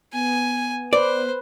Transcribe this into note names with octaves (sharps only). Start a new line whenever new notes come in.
B3 G#5
B4 C5 D5